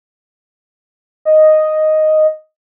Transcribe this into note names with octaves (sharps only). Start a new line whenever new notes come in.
D#5